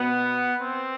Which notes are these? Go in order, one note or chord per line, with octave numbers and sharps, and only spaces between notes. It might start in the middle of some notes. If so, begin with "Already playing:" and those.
Already playing: B2 B3
C4